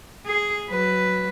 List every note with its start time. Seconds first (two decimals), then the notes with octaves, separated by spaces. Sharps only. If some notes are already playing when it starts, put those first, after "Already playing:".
0.26 G#4
0.69 F#3 B4